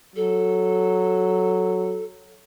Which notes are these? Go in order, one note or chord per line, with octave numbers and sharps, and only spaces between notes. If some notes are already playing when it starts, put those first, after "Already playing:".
F#3 A4